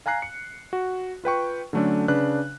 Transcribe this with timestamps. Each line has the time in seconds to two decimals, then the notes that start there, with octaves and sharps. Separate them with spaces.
0.06 F5 G#5 A#5 F#6 C7
0.22 C#7
0.73 F#4
1.24 F4 B4 G5 C#6
1.73 D3 F#3 A3 C#4 D4
2.08 C#3 D4 B4 F#6